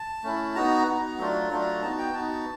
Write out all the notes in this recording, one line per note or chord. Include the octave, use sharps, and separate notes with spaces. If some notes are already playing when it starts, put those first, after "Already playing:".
Already playing: A5
A3 C#4 E4
B3 D#4 F#4 A#5
B3 D#4 F#4
F#3 A3 D4 F4
F#3 A3 D4 F4
B3 D#4 F#4 A5
G5
B3 D#4 F#4 A5